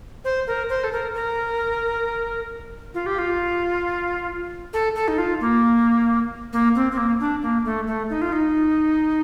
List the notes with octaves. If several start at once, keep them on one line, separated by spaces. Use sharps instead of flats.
C5
A#4
C5
A4
A#4
A#4
F4
G4
F4
A4
A4
D#4
F4
A#3
A#3
C4
C4
A#3
D4
A#3
A3
A3
D#4
F4
D#4